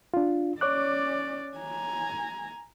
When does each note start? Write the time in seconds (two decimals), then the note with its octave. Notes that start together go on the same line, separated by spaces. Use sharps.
0.14 D4 F4
0.61 C#4 C#5 D5 D6 F#6
1.57 G#5 A#5